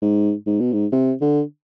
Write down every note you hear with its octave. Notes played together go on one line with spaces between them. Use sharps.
G#2
G#2
B2
G#2
C3
D3